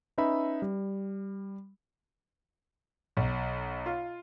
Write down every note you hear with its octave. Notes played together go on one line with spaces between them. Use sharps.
C#4 D#4 B4 E5 B5
G3
B1
F4